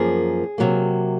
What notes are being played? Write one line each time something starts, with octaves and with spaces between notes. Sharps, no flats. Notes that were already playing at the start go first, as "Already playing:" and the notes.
Already playing: F#2 F3 A#3 G#4
C3 F#3 A#3